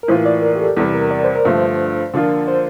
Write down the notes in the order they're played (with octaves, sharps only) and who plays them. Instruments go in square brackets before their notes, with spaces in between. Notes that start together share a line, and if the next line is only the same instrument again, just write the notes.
[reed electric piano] A#4
[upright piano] A2 E3 A#3 F4 [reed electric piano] C5
[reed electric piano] D5
A#4
G4
A4
[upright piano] E2 C3 G3 [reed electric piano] A4
[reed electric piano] A#4
D5
C5
A#4
[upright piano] G2 D3 F3 A3 [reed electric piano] C5
[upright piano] D3 F3 A#3 D4 F4
[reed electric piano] C5